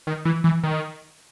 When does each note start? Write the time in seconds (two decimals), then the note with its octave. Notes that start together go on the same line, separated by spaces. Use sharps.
0.07 D#3
0.25 E3
0.44 E3
0.63 D#3